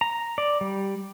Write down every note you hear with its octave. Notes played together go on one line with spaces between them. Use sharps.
A#5
D5
G3